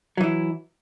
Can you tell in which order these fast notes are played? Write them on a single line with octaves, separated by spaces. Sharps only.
F#3 E3 E4